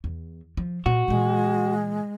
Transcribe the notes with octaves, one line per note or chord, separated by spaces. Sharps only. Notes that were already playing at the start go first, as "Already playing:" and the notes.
E2
F3
A#2 F#4
A#2 E3 G#3